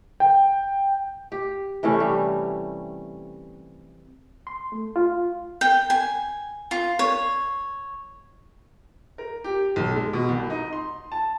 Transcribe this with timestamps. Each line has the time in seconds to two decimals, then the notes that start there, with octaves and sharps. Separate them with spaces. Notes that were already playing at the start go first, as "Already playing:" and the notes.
0.20 G5
1.32 G4
1.83 C3 E3 A3 C#4
2.00 G3
4.47 C6
4.72 A3
4.96 F4
5.61 G5
5.90 G#5
6.71 F4
6.99 C#5
9.18 A#4
9.44 G4
9.76 B1
9.96 G#3
10.13 B2
10.29 C2
10.50 D#4
10.73 C6
11.12 A5